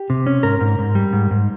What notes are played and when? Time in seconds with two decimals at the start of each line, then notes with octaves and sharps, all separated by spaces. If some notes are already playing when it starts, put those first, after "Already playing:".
Already playing: G4
0.10 C3
0.26 C#4
0.43 G#2 A#4
0.61 G#2
0.79 G#2
0.95 G3
1.13 G#2
1.31 G#2